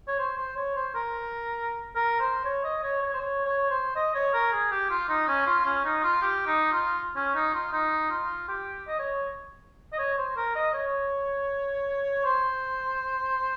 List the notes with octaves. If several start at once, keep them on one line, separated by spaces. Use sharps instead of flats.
C#5
C5
C5
C#5
C5
A#4
A#4
C5
C#5
D#5
C#5
C#5
C5
C#5
C#5
C5
D#5
C#5
A#4
G#4
G4
F4
D#4
C#4
F4
C#4
D#4
F4
G4
D#4
F4
C#4
D#4
F4
D#4
F4
G4
D#5
C#5
D#5
C#5
C5
A#4
D#5
C#5
C5